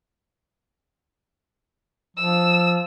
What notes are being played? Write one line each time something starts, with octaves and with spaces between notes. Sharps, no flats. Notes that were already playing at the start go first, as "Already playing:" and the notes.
F3 E6